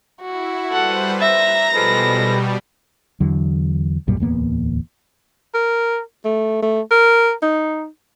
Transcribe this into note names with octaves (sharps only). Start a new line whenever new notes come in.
E4 F#4
G3 A4 B4 C5 F#5
E5 A#5 A#6
B2 F3 G3 G#3 A4 B4
E2 D3 F#3
B1 F#2 A#2 G3
D1 E2 A#3 B3
A#4
A3
A3
A#4
D#4